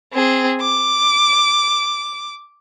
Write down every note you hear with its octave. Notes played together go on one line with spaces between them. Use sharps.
C4 G#4
D6